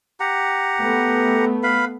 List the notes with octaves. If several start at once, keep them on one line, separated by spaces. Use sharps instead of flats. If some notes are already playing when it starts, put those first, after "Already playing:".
G4 F#5 A#5
A3 B3
B4 F5 B5